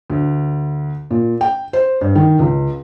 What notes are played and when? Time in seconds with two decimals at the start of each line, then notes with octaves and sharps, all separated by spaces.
0.10 D2
1.11 A#2
1.41 G5
1.73 C5
2.01 G2
2.15 D#3
2.39 C#2